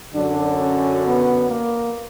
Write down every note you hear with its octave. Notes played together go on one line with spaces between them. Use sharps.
F#2 D3 F#3 D4
C#4
B3
A#3